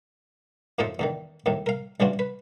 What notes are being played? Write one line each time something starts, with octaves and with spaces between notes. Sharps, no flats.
F#2 A2 F3 D#4 A4 C5
E2 D3 D#3
D#2 A2 D#3
A#4 F5
A1 C#3 E3 D4 F4 F#4
B4